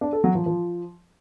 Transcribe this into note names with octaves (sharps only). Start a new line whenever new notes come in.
D4
A4
F#3
F3
F3